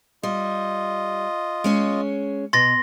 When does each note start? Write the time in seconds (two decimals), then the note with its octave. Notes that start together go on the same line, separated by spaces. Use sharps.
0.23 G3 F4 D#5
1.64 G#3 C#4 C#5
2.53 B2 C6 A6 A#6